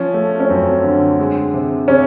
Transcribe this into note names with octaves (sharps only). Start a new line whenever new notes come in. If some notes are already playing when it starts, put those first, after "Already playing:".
Already playing: F3 C#4
A3
C#4
F#2 C4
D3
G#3
C3
C3 C#4